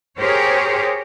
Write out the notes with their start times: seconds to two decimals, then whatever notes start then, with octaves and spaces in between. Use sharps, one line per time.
0.17 G4 G#4 A#4 C5 C#5